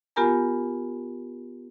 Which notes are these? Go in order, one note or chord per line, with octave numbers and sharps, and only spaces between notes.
B3 F4 G4 A#4 G#5 A#5